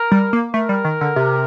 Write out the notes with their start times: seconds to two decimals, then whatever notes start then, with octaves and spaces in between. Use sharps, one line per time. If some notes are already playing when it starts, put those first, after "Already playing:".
Already playing: A#4
0.12 G3
0.33 A#3
0.54 A3 A#4
0.69 G3
0.85 D#3
1.01 D3
1.16 C3